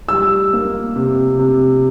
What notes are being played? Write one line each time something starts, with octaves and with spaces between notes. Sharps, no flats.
G3 E6
A#3
C3
C3